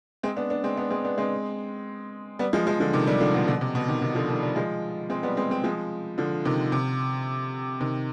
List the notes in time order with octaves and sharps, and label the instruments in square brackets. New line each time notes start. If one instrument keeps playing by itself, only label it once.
[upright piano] G#3 C4
B3 D4
B3 D4
G#3 C4
B3 D4
G#3 C4
B3 D4
G#3 C4
G3 B3
F3 G#3
F3 G#3
D3 F3
C3 D#3
D#3 G3
D3 F3
B2 D3
B2 D3
C3
B2
C3 D#3
C3 D#3
D3 F3
D#3 G3
D#3 G3
F3 G#3
G#3 C4
G3 B3
G#3 C4
G#3 C4
F3 G#3
D3 F3
C3 D#3
C3
C3 D#3